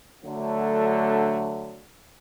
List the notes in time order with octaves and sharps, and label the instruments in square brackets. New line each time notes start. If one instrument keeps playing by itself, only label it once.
[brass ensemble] D3 F#3 A3